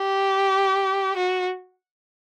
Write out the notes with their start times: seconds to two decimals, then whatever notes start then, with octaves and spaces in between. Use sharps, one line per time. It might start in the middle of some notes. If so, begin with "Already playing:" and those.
Already playing: G4
1.17 F#4